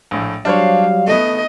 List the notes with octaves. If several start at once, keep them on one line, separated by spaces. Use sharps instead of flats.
A#1 A2
F#3 G3 D4 C5 C#5 F5
A3 B3 D#5